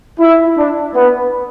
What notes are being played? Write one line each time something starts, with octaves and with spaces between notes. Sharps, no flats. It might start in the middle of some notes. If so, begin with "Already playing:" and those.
E4
D4
B3